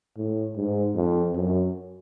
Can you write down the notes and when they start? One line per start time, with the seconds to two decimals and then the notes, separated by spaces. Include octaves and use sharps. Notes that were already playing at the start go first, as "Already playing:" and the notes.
0.17 A2
0.57 G#2
0.95 F2
1.35 F#2